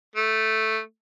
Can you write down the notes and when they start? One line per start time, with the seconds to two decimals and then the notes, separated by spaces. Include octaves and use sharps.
0.16 A3